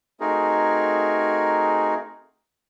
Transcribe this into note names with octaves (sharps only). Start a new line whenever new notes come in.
A3 C4 D#4 F#4 G#4 A#4